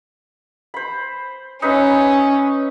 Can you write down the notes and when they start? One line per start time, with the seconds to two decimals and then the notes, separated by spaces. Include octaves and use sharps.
0.74 C5 B5
1.62 C#4 D#4 B4 E5